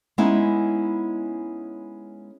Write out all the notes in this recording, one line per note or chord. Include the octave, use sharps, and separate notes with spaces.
G#3 B3 C#4 D#4 E4